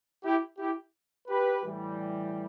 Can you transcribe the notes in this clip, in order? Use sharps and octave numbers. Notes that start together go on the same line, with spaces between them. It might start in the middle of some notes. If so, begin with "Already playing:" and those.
E4 G4
E4 G4
G4 B4
A2 E3 G3